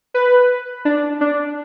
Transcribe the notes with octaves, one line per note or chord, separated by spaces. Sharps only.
B4
D4
D4